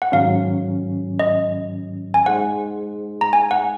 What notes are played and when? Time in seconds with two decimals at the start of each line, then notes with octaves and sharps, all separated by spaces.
0.02 F#5
0.12 G#2 D#3 F#3 C#4 F5
1.19 D#5
2.14 G#5
2.26 G#3 D#4 G#4 C5 F#5
3.21 A#5
3.33 G#5
3.51 F#5